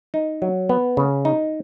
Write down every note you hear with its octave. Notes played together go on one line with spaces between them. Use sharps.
D#4
F#3
B3
C#3
D#4